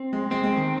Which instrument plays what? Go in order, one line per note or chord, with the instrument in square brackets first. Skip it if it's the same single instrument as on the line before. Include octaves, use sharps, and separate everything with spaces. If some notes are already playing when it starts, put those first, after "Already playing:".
Already playing: [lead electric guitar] C4
[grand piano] G#3
[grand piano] G#3 [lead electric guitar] C4
[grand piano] G#3
D#3